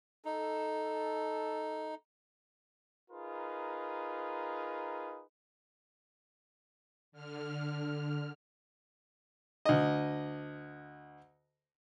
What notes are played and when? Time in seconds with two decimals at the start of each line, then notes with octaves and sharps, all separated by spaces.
0.25 D#4 A4
3.11 D#4 F4 G#4 A#4 B4
7.12 D3 F6
9.65 D2 D#5